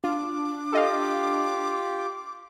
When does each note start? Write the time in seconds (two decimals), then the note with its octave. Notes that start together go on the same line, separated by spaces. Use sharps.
0.04 D4 F4 D6
0.72 F4 G4 A4 D#5 F5